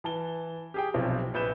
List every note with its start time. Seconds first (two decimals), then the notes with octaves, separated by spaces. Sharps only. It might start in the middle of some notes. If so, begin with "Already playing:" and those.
0.04 E3 A5 G7
0.74 G4 G#4 G5
0.94 B1 C3 F3
1.34 A#1 B4 G6 E7